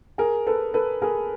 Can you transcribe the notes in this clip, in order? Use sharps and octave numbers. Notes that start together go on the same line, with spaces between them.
G#4 A#4
A4 B4
A4 B4
G#4 A#4